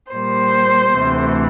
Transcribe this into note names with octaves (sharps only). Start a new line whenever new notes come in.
A#2 G3 C5
D2 C3 E3 A3